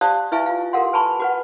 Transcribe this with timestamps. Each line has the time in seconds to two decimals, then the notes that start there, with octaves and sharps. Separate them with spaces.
0.01 G4 C5 D5 F5 A5 D#6
0.32 E4 B4 E5 F5 G#5 C#6
0.46 F4 F5
0.73 G4 A4 A#4 F5 F#5 C6
0.93 B4 G#5 A5 B5 C#6
1.20 F#4 B4 F#5